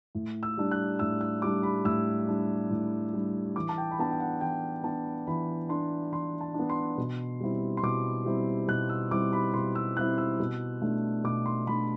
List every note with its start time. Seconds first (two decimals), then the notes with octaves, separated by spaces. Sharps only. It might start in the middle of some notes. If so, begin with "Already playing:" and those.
0.15 A2
0.43 E6
0.57 G3 D4
0.71 F#6
0.99 A2 E6
1.21 E6
1.42 G3 D4 D6
1.63 B5
1.85 A2 E6
2.28 G3 D4
2.71 A2
3.13 G3 D4
3.56 E3 D6
3.69 A5
3.78 G5
3.91 B5
3.99 B3 D4 A5
4.11 G5
4.20 F#5
4.41 E3 G5
4.83 B3 D4 A5
5.27 E3 B5
5.69 B3 D4 C6
6.12 E3 C6
6.41 A5
6.54 B3 D4
6.70 C6
6.98 B2
7.40 G3 C4 E4
7.77 C6
7.83 B2 D6
8.25 G3 C4 E4
8.68 B2 F#6
8.89 E6
9.11 G3 C4 E4 D6
9.33 B5
9.54 B2 C6
9.75 E6
9.96 G3 C4 E4 F#6
10.18 E6
10.40 B2
10.82 A3 D4
11.24 B2 D6
11.46 C6
11.67 A3 D4 B5